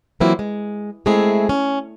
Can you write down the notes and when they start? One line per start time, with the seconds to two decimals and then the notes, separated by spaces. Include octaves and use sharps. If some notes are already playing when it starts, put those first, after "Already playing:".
0.20 E3 F#3 A#3 C4 E4 F4
0.39 G#3
1.06 G#3 A3 C4 E4 G#4
1.49 C#4